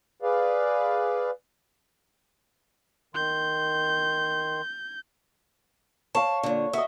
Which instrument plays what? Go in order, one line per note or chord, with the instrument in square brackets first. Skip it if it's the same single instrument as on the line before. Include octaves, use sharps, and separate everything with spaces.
[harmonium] G#4 B4 D5 F5
[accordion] D#3 C6 [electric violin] G6
[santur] C#5 F5 [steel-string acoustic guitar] A5
[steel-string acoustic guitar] A#2 D3
[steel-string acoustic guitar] F#4 [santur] D#5 E5